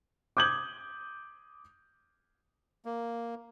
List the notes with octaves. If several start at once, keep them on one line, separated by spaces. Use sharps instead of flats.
D6 D#6 G6 G#6 F#7
A#3